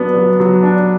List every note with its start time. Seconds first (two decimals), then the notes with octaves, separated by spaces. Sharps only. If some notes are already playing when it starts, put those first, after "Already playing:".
Already playing: F#3 B3 D4
0.17 F#3
0.40 F#3
0.63 D4